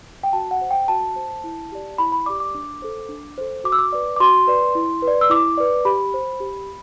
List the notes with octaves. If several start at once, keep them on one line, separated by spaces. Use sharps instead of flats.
G5
F#4 A5
F#5
C5
G5
F#4 A5
C5
E4
G4 D5
E4 B5
B5
G4 D5 D6
D6
D4
A4 C5
D4
A4 C5
F#4 D6
E6
D6
B4 D5
D6
F#4 C6
B4 D5
E4
B4
D5
E6
E4 D6
B4 D5
G4 B5
C5
G4